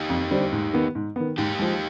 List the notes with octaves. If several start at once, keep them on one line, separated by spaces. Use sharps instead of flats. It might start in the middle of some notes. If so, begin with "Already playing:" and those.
Already playing: D#4 G4
F2
D3 G3 C4
G#2
D#3 B3
G#2
D#3 B3
G#2 D#4 G4
F3 G#3